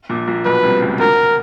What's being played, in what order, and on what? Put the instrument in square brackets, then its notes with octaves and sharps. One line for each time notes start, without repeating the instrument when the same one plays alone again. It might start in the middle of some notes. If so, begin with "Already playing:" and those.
[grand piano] A#1 A#2
A#1 A#2
[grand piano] B1 B2 [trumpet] B4
[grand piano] C2 C3
C#2 C#3
[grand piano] D2 D3 [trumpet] A#4